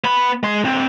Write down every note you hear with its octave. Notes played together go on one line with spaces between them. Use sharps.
B3 B5
G#3 C6
D3 C4